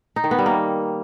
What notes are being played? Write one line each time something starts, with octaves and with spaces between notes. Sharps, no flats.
D#4
D#3
B3
G3
A#3